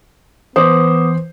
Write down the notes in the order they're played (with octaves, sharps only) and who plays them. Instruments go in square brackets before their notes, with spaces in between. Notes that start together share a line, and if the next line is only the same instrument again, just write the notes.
[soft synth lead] E3 [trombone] B3 [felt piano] C5 [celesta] D6 D#6